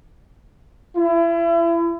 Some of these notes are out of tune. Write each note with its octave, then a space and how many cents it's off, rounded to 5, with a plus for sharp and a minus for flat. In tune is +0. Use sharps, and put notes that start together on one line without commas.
E4 +35